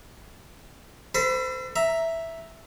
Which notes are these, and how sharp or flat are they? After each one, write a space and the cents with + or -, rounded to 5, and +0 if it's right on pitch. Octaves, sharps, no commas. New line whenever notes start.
A4 +35 C5 -30 B5 +5
E5 +0 A#5 +0